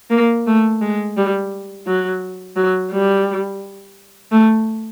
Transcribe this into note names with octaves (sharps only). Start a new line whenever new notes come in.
A#3
A3
G#3
G3
F#3
F#3
G3
A3